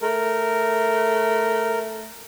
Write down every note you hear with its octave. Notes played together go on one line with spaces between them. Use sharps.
A3 A#4